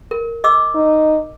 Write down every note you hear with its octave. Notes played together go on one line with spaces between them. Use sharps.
A#4
D#5 D6 E6
D#4